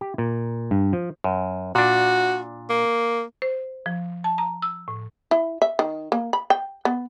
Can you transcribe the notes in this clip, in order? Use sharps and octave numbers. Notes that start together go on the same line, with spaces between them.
G4
A#2
G2
F3
F#2
A#2 D4 F#4
A#3
C5
F3
A5
A#5
E6
A2
E4
E5
D#3
A#3
B5
G5
B3